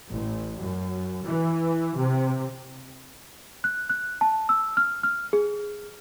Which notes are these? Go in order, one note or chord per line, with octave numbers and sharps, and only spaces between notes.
A1
F#2
E3
C3
F#6
F#6
A5
E6
F6
F6
G#4